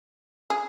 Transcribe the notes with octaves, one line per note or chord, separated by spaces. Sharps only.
G#4